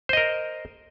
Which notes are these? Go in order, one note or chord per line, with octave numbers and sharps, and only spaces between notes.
A#4 C5 D#5